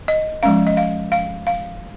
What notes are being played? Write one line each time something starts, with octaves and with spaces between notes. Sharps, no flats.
D#5
F3 G#3 C#4 F5
D#5
F5
F5
F5